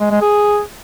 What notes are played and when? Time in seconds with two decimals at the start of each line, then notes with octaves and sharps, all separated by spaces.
0.01 G#3
0.11 G#3
0.22 G#4